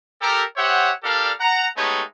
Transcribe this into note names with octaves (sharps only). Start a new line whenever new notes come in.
G4 A4 A#4
G4 C5 C#5 E5 F#5
D4 G4 A4 A#4 D5 F5
F#5 A#5
G#3 A3 B3 D#4 G4 C#5